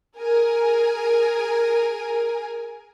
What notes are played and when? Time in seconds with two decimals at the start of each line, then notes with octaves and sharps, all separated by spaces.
0.18 G#4 A#4 G#5